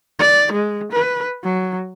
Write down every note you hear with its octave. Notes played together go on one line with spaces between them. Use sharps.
D5
G#3
B4
F#3